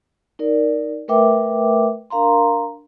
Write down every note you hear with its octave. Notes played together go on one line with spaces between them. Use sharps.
D#4 A#4 D5
A3 A#4 B4 E5 G5 D6
D4 A#4 F5 A#5 C6